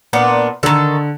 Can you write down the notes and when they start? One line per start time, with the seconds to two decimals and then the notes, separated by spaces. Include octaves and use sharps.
0.13 A#2 B3 D4
0.63 D3 D#3 A4